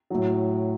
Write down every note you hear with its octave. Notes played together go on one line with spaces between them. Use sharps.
A2 F#3